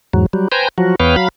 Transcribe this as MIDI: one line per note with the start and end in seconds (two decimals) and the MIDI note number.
0.13 0.26 40
0.13 0.26 44
0.13 0.26 54
0.33 0.48 54
0.33 0.48 55
0.52 0.68 71
0.52 0.68 72
0.52 0.68 79
0.52 0.68 80
0.52 0.68 82
0.78 0.95 53
0.78 0.95 54
0.78 0.95 66
1.00 1.16 40
1.00 1.16 59
1.00 1.16 71
1.00 1.16 73
1.00 1.16 77
1.00 1.16 79
1.16 1.28 54
1.16 1.28 77
1.16 1.28 83